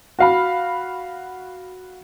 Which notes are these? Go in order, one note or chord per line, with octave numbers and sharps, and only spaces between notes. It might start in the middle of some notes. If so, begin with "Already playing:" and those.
F#4 F5 B5